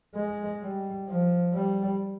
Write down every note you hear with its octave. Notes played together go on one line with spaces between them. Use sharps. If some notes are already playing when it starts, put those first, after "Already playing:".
G#3
G3
F3
G3